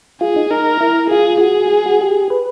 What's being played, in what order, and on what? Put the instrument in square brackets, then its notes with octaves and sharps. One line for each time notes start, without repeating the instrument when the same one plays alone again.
[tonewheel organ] F4 [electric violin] G#4
[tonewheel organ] D#4
[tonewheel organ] D#4 [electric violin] A#4
[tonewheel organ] E4
[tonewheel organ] F4 [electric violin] G#4
[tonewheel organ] F#4 [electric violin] G#4
[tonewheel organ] F#4
G4
B4